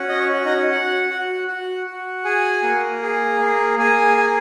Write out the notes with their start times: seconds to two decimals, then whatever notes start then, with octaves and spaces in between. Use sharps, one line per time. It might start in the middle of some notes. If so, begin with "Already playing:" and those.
Already playing: C#4 F#4
0.09 D#5
0.20 C#5
0.33 F#4
0.45 D#4 D#5
0.71 F#4 F#5
1.10 F#4
1.48 F#4
1.87 F#4
2.24 G#4 G#5
2.63 A#3
3.02 G#4
3.40 A#3
3.79 A#3 G#4 G#5
4.17 G#4